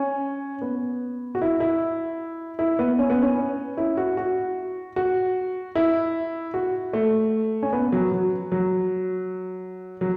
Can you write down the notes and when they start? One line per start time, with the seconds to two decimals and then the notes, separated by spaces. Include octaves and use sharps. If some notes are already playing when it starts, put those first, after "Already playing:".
Already playing: C#4
0.61 B3
1.35 F#4
1.42 E4
1.60 E4
2.59 E4
2.79 B3
2.99 C#4
3.10 B3
3.23 C#4
3.77 E4
3.97 F#4
4.17 F#4
4.96 F#4
5.75 E4
6.54 F#4
6.93 A3
7.63 C#4
7.73 B3
7.92 F#3
8.12 F#3
8.52 F#3
10.01 F#3